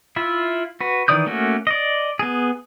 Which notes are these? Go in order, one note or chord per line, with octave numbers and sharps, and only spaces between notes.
E4 F4 E5
F#4 B4
D#3 E3 D5 D#6 G6
A3 A#3 C#4 F#4
D5 D#5
B3 G#4